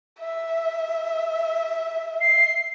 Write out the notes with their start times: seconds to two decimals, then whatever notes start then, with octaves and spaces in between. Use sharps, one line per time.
0.19 E5
2.21 C7